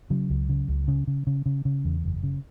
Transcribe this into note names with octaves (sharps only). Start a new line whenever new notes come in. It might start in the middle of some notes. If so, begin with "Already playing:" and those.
C#3 F#3
C#2
C#3
C#2
C#3
C#3
C#3
C#3
C#3
E2
F#1
C#3